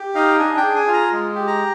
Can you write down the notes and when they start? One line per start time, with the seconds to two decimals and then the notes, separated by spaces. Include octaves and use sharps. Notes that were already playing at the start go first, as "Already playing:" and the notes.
Already playing: G4
0.15 D#4 F5
0.39 D4 G#5
0.57 G5
0.63 G#4
0.76 G#5
0.88 F4
0.93 A#5
1.12 G#3
1.35 G4
1.47 A#5